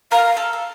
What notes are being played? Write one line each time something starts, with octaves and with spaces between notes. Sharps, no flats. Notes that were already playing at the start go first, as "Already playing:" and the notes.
A#4 F5
A4
A4